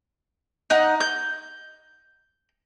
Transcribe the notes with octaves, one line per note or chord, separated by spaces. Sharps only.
D#4 F#5
G6